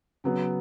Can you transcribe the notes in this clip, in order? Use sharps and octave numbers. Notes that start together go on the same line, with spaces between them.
C#3 F#3 B3